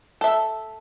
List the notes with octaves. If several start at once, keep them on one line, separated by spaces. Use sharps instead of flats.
A4 E5